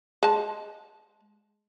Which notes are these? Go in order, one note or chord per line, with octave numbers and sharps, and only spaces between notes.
G#3 A5